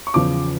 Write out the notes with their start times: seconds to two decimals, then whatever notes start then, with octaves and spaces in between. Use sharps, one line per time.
0.07 C#6
0.14 E2 C#3 F3 D6